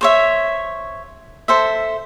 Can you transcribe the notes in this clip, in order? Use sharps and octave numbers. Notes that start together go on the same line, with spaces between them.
C5 C#5 E5
A4 C5 E5